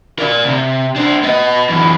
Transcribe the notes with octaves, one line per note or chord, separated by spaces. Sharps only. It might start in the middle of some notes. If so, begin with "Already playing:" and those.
A#4 D5
C3
D4 C5
B3 D#5
F#2 E3